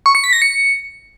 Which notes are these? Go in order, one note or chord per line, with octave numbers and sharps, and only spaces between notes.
C#6
C#7
B6
A#6
C#7